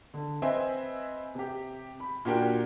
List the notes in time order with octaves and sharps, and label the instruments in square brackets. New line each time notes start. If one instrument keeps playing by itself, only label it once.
[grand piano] D3
C4 B4 D#5 E5 G#5 C6
C3 G4
B5
A#2 D4 F#4 G4 A#4 G5